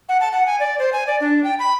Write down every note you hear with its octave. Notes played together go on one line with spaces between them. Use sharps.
F#5
A5
F#5
G#5
D5
C5
G#5
D5
D4
G5
B5